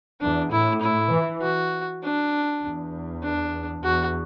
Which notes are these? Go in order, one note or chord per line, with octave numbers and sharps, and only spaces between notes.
E2 D4
A2 E4
E4
E3
F#4
D4
E2
D4
E2 F#4